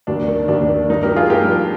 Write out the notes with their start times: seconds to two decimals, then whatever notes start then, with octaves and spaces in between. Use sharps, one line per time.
0.07 D#2 D4
0.28 D#3
0.48 D#2 D4
0.68 D#3
0.90 G2 D#4
1.03 G4 A#4
1.10 F3
1.16 F4 G#4
1.30 G2 G4 A#4
1.50 F3